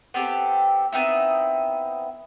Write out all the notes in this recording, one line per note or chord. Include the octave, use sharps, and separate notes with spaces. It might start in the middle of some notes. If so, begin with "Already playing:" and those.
B3 C4 G4 A4
B3 C4 D#4 E4